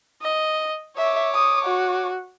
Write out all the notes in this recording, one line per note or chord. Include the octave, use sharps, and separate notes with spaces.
D#5
C#5 E5 D6
D#6
F#4